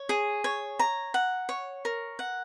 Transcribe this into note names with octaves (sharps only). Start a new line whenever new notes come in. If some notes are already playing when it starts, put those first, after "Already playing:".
Already playing: C#5
G#4
C#5
A#5
F#5
C#5
A#4
F#5